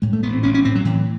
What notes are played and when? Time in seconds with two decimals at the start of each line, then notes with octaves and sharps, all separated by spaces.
0.02 A2 G#3
0.13 A3
0.23 A1 B3
0.33 C4
0.43 A1 C#4
0.54 C#4
0.65 A2 C4
0.75 F#3
0.85 A2 E3